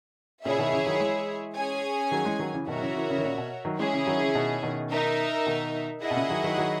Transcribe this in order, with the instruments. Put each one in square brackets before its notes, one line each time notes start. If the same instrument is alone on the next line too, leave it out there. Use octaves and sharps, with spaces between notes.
[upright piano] A#2 C#3 [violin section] E4 G#4 C#5 E5
[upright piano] B2 D#3
C#3 E3
D#3 F#3
E3 G#3
[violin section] C#4 G#4 C#5 G#5
[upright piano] D#3 F#3
E3 G#3
D#3 F#3
C#3 E3
[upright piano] B2 D#3 [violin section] F#4 A#4 C#5 E5
[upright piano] F#3
C#3 E3
C#3 E3
C#3 E3
D#3
A#2 C#3
B2
D#3 F#3
[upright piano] E3 G#3 [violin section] C#4 E4 G#4
[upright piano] C#3 E3
D#3 F#3
C#3 E3
B2 D#3
B2 D#3
[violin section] D#4 A#4 E5
[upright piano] B2 D#3
[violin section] E4 G#4 D#5 F#5
[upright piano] B2
A#2 C#3
D#3 F#3
D#3 F#3
D#3 F#3